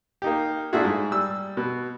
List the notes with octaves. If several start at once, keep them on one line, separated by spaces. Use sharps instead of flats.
A#3 D#4 G4
A#2 A3 D4 E4 F#4 G#4
G#2
G3 E6
B2